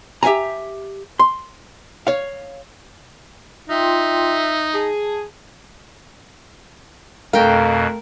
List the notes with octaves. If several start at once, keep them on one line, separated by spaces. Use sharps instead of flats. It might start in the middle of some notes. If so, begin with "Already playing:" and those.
G4 E5 F5 G#5 A#5
C6
C#5 F5
D#4 F4 E5 G5 C6
G#4 A5
F2 B2 A3 A#4 F5 G5